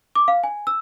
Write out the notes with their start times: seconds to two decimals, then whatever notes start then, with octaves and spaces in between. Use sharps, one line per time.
0.15 D6
0.28 F5
0.44 G#5
0.67 E6